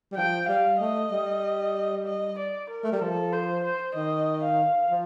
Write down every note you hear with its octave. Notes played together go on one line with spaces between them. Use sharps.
G3
F3 G5
G3 F5
A3 D#5
G3
D#5
D5
A#4
A3
G3
F3 A4
C5
C5
D#3 D#5
F5
F3